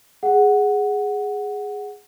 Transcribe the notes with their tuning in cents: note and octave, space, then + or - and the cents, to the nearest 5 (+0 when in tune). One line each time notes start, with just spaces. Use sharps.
G#4 +0 F#5 +0